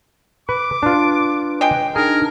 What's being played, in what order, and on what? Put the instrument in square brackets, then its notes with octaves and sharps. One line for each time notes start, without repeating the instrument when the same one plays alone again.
[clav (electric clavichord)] B4 [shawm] D6
[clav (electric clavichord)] D4 F4 [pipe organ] B4
[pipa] G#3 G5
[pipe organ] D4 D#4 F6 [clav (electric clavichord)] G#4 [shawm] A#4